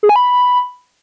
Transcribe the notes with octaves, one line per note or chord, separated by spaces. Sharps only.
G#4
G#5
B5